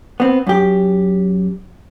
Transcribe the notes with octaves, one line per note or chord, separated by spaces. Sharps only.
B3 C4
F#2 G4